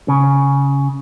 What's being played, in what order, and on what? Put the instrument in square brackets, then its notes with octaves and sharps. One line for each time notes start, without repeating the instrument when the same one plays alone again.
[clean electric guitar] C#3